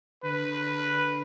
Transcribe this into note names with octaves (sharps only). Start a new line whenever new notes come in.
D3 B4